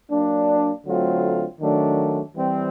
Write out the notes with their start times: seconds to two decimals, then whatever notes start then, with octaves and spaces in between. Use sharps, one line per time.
0.11 F#3 A#3 D4
0.86 D3 F#3 A3 C4 F4
1.61 D#3 F#3 A3 D4
2.36 E3 G3 C4